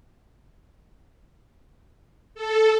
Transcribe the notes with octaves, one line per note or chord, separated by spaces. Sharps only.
A4